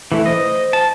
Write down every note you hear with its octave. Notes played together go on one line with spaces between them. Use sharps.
E3 A3 E4
C5 D#5
A5